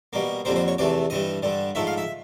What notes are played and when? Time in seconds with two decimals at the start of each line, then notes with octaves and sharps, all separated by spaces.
0.13 B2 G3 A#3
0.45 F2 D3 G3 A#3 C5
0.56 C5
0.68 C#5
0.78 E2 C3 E3 A3 D5
1.10 G2 E3 G3 D#5
1.43 G2 D3 G3
1.75 G#2 F3 A3 E5
1.87 F5
1.98 E5